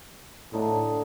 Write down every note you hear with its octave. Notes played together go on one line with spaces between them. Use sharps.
A2 D3 D4 D#4